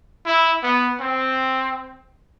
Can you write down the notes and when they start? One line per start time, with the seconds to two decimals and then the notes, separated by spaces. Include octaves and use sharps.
0.26 E4
0.63 B3
1.00 C4